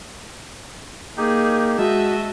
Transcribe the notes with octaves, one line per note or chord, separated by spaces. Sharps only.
A#3 D#4 G4 G#4
G#3 F#4 D#5 E5 A5